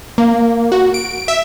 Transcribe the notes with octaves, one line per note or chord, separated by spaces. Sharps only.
A#3
F#4
D7
E5